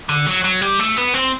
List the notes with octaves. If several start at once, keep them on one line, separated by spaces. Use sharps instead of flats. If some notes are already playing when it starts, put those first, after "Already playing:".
D3
F#3
F#3
G3
A3
B3
C4